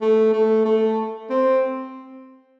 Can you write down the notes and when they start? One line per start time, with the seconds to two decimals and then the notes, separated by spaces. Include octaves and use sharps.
0.01 A3
0.33 A3
0.65 A3
1.30 C4